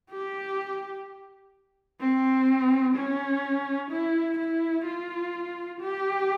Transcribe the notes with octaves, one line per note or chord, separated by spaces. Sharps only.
G4
C4
C#4
E4
E4
F4
G4